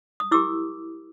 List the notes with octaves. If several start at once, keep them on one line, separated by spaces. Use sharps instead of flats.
D#6
E4 G4 A#4 D6 E6